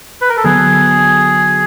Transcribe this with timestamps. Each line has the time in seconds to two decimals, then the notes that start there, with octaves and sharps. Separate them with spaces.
0.21 B4
0.29 A#4
0.37 A4
0.44 D3 F#3 B3 G#4